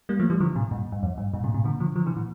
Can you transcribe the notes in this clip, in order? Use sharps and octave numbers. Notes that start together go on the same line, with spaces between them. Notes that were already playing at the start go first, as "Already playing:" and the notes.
G3 A#3
F3 A3
E3 G3
D3 F3
A2 C3
G2 A#2
G2
F2
G2
G2 A#2
A2 C3
A2 C3
A#2 D3
D3 F3
D3 F3
C3 E3
A#2